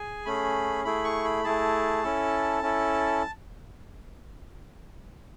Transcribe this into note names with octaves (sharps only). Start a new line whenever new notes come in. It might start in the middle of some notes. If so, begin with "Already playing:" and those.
Already playing: G#4 G#5
A3 C#4 G#4 B5
A3 E4 G#4 B5
C#6
B5
A3 E4 G#4 A5
C#4 E4 A4
C#4 E4 A4